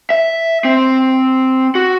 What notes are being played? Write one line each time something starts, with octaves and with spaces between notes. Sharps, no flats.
E5
C4
F#4